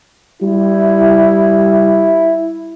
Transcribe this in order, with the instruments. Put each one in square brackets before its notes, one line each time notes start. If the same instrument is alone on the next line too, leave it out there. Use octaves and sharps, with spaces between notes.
[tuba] G3 [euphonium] E4